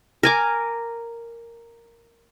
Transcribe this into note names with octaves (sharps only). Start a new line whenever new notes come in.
A#4 G#5 D6